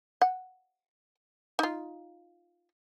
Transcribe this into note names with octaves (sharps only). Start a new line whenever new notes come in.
F#5
D#4 F4